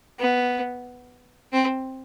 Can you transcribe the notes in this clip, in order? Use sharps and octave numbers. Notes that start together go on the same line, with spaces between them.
B3
C4